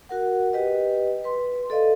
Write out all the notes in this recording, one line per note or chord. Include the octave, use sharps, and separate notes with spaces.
F#4 A#4 F#5
G4 B4 D#5 G5
B4 C6
A4 D5 D#5 F5